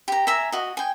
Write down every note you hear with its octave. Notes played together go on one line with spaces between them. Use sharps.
G4 A#5
E5 G#5 A#5
F#4 D#5
G5 G#5